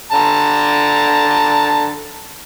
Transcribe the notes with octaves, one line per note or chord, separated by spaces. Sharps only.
D3 A5 A#5